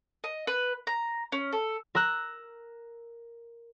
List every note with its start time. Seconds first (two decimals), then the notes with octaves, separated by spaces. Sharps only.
0.24 D#5
0.47 B4
0.87 A#5
1.32 C#4
1.52 A4
1.95 A#4 A#5 E6 F#6